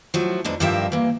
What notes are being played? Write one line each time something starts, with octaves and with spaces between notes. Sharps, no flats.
F3 F#3 A3
E2 G#2 D3 D4
G2 D3 F3 A#4 E5 G5
E3 A#3